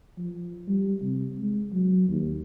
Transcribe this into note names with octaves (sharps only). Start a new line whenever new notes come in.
F3
G3
C3
G#3
F#3
D#2